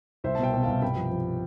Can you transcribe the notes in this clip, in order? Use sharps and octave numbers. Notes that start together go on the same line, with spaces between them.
C2 C5 E5
A5
B2 E5 G5
B2
C2 F5 A5
G2 G5 B5
F3
F3